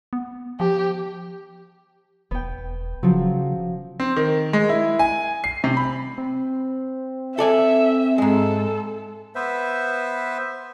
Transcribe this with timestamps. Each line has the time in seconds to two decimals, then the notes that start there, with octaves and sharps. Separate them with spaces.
0.13 B3
0.60 F3 G4
2.31 E1 B3 G5
3.03 C#3 F3 F#3
4.00 C4
4.16 D#3
4.53 G#3
4.69 E4
4.99 G#5
5.44 C7
5.64 C3
5.77 B5
6.18 C4
7.39 A4 D5 E5 G#5
8.18 G#2 G#3 A4
9.35 B3 B4 C5 E5